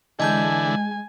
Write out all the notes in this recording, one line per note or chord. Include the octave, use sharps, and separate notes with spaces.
D3 E3 G#3 D#5 G#5 A5 G6